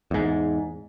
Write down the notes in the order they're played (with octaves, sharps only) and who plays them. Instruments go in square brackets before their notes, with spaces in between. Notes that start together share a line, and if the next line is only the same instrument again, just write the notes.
[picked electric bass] E2 G#2